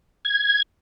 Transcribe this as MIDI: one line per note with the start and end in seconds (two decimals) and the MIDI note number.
0.25 0.62 92